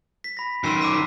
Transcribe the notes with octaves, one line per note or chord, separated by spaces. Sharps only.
B6
B5 A#6
F#2 D#3 C6 E6 C7
D6 E6 B6